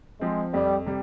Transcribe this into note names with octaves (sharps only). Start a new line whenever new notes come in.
F3 G#3 C4
F2 G3
C3 G3